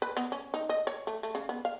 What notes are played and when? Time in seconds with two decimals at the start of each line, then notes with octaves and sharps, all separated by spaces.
0.02 B4
0.17 B3
0.32 C#4
0.54 D#4
0.69 D#5
0.87 C#5
1.07 A3
1.23 A3
1.35 C#3
1.49 B3
1.65 F5